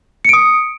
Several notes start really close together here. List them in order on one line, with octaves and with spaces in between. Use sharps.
C#7 D7 D#6